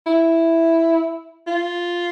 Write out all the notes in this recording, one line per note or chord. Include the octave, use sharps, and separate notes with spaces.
E4
F4